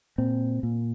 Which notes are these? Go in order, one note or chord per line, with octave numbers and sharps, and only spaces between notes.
A#2 C4
A#2